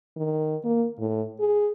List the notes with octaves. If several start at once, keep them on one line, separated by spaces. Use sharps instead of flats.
D#3
A#3
A2
G#4